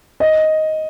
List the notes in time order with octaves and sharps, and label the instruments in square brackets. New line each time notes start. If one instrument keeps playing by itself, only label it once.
[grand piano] D#5